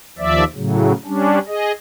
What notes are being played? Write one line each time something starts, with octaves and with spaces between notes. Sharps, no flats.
D#2 F3 D5 E5
A2 C#3 F#3
G3 C#4 D4
G#4 D#5